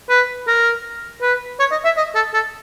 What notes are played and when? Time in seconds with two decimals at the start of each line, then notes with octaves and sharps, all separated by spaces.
0.09 B4
0.47 A#4
1.21 B4
1.59 C#5
1.71 D#5
1.84 E5
1.97 D#5
2.15 A4
2.34 A4